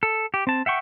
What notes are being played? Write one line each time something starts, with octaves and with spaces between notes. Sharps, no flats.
A4
G4
C4 A5
E5 F#5 G5 C#6